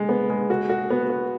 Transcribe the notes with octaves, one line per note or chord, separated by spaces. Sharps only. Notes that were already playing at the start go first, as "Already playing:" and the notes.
Already playing: G#3
B3
G#3
F#4
F#4
B3
F#4